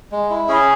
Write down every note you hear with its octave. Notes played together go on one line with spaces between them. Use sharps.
G#3
E4
C#4 G#4